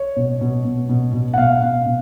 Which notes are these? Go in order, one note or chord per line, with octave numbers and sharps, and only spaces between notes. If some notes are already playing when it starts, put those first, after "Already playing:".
Already playing: C#5
B2
B2
B2
B2
B2
F#5
B2 F5
B2
B2